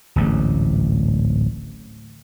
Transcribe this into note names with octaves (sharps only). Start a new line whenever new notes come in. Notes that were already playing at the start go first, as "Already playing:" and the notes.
D1 A1 G#2